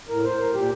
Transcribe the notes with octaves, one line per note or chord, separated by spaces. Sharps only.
A2 A#4
C5
A#4
A#2 G4